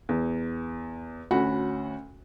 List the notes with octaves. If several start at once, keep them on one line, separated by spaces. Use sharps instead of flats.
E2
D2 C#4 F#4 F#5 B5